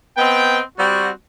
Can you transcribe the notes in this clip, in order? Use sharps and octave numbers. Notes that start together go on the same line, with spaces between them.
B3 C4 D#5 G5
G3 C4 F#4